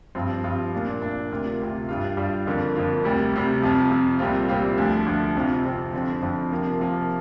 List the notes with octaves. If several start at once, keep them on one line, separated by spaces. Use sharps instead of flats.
G2 F3 C4 F4
G2 F3 C4 F4
A#2 A#3 D4
A#2 A#3 D4
D2 C3 A#3 F4
D2 C3 A#3 F4
G2 G3 D4 F4
G2 G3 D4 F4
F2 D3 A#3 F4
F2 D3 A#3 F4
D2 C3 G3
D2 C3 G3
F2 C3 F3
F2 C3 F3
C2 A#2 G3 C4 F4
C2 A#2 G3 C4 F4
D2 D3 F3 D4
D2 D3 F3 D4
F2 C3 F3 C4 F4
F2 C3 F3 C4 F4
F2 D3 F3 C4
F2 D3 F3 C4
C3 F3 A#3 F4
C3 F3 A#3 F4